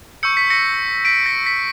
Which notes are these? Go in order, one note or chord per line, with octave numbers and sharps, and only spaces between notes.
C#6 E6 G6 C#7
B6
A#6 C#7
B6 D7
A#6
B6